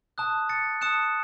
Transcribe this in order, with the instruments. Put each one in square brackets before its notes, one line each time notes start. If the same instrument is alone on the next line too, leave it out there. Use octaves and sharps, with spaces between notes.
[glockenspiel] A5 D#6 F#6
A6 C#7
A5 D#6 F#6 C#7 E7